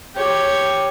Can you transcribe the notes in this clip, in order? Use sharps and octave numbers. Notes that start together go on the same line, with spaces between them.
G4 C#5